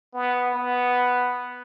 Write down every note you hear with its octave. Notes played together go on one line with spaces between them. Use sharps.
B3
B3